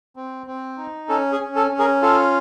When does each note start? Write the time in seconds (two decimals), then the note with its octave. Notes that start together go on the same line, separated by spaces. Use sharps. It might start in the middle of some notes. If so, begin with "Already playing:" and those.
0.16 C4
0.47 C4
0.78 D#4
1.09 C#4 A4
1.32 G#4
1.40 C#4
1.56 A4
1.71 C#4
1.79 G#4 A#4
2.02 F4 A4